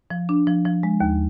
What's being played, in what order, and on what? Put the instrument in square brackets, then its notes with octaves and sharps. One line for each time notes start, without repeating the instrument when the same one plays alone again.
[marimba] F3
D4
F3
F3
G#3
D#2